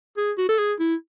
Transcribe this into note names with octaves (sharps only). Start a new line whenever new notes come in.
G#4
F#4
A4
G#4
E4